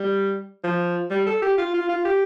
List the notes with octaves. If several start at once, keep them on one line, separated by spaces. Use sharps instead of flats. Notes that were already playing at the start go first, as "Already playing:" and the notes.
Already playing: G3
F3
G3
A4
G4
F4
F4
F4
G4